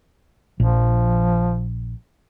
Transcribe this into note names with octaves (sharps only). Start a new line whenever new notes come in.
A#1 F3